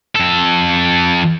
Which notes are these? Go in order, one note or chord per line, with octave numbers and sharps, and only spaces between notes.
F2 A4